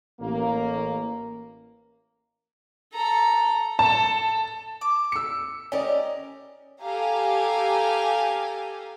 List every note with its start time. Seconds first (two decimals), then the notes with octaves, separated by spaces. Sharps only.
0.21 A1 A#3
2.93 A4 A#5
3.79 A4 A5
4.81 D6
5.12 E6 C#7
5.72 C#4 G4 A#4 D5 D#5
6.84 G4 A4 F5 G#5 A#5